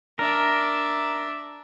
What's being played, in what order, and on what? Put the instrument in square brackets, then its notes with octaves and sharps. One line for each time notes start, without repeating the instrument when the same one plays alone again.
[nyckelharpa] D4 E5 [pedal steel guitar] A#4